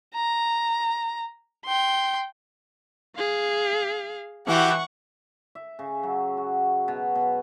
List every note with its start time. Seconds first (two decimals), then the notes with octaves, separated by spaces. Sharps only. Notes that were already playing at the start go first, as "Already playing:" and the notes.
0.15 A#5
1.65 G5 C6
3.16 G#4 F5
4.48 E3 F#4 G4 F#5 C#6
5.55 E5
5.79 C#3
6.03 F#3
6.37 F#4
6.88 B2
7.15 B2